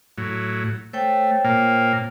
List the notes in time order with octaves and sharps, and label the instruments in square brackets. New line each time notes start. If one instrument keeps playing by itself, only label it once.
[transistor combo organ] A2 F#3
[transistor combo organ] A3 [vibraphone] C5 C#5 G5
[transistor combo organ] A#2 A#3